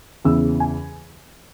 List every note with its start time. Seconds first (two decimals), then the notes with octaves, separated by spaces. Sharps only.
0.25 E2 C#3 E3 E6
0.60 G#5